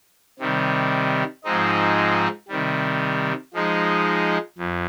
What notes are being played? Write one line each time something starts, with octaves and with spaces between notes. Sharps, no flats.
C3 D#3 G3
G#2 F3 G#3 C4 D#4
C3 D#3 G3
F3 G#3 D#4
F2